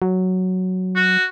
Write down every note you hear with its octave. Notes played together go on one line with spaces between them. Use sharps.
F#3
F#4